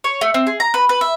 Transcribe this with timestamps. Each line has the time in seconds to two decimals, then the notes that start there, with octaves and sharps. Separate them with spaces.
0.04 C#5
0.21 A3
0.34 C4
0.47 G#4
0.60 A#5
0.74 B4
0.89 B4
1.01 E5